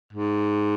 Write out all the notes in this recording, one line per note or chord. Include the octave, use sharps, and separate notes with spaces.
G#2